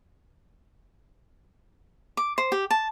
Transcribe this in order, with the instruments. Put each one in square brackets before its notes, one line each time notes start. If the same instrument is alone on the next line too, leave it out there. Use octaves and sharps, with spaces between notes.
[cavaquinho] D6
C5
G4
A5